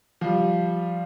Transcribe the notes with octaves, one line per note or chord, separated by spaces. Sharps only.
F3 G3